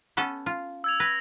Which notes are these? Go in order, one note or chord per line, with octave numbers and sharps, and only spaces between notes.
B3 C#4 A4
F4
E6 G#6 F7
B4 G#6 A#6